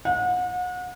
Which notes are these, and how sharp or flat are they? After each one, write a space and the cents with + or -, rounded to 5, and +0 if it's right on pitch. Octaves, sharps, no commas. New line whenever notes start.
F#5 -35